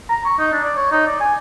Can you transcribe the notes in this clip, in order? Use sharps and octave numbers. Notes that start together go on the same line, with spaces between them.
A#5
C#6
D#4
D4
D5
C#5
D#4
D5
G#5